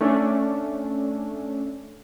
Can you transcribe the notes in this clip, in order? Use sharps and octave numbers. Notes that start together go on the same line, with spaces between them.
A3 C#4 D4